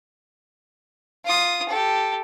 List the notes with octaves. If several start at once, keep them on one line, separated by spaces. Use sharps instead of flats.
F4 D#6
G4 A4